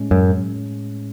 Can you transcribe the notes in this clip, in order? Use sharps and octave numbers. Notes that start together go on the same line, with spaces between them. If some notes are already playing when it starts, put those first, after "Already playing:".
Already playing: A2 G#3 C#4
F#2